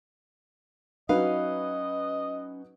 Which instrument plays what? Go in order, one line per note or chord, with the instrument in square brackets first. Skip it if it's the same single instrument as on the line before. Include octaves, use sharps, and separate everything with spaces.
[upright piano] F#3 D#4 B4 [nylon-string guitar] C#4 F5 [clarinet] D#5